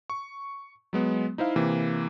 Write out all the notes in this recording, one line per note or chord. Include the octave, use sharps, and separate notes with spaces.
C#6
F#3 G#3 B3
D#4 E4 C5 F5
C3 E3 A#3